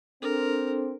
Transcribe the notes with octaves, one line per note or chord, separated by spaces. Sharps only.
C4 D4 A4 A#4